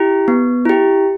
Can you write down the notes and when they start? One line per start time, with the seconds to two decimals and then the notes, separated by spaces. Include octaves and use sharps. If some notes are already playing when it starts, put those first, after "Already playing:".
Already playing: E4 G4
0.28 B3
0.65 E4 G4